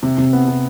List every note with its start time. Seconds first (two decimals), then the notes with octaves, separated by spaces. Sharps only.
0.03 C3
0.18 C3
0.33 B3
0.48 C3